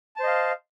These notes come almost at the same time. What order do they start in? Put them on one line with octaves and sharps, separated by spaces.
A5 C5 D#5 F5